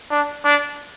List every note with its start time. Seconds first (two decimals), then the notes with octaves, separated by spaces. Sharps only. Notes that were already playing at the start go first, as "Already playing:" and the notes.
0.11 D4
0.45 D4